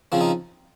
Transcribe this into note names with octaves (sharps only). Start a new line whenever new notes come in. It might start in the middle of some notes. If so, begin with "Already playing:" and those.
C#3 F3 C4
D#4